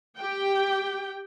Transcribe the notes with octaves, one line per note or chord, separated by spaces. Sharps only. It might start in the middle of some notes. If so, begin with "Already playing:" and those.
G4 G5